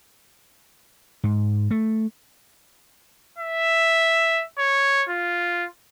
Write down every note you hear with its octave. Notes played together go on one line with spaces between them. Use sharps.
G#2
A3
E5
C#5
F4